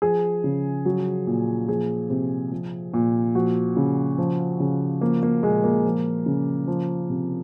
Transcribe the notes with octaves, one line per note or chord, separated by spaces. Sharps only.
F3 G#4
C#3
F#3
A#2
F3 G#4
C3
F3
A#2
F3 F#4
C#3
F3
C#3
F3 A#3
A#3
A#2 G#3
A#3
F3
C#3
F3
C3